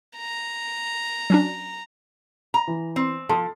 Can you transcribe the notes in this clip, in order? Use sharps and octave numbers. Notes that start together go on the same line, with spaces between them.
A#5
F#3 C#4 D4
A#5
E3
C4
F3 A4 A5 C6